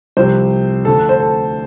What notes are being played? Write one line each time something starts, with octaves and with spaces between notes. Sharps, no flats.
C2 C3 F3 C5
D2 D3 F3 A4
C5
A4